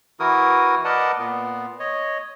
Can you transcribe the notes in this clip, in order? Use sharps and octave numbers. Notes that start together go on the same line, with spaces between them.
E3 E4 F#4 A#4 D#6
A#4 B4 D5 D#5 F#5 A5
A#2 B3
C#5 D#5